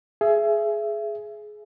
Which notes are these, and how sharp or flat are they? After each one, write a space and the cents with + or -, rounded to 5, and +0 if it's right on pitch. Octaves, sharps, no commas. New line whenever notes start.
G#4 +20 E5 +25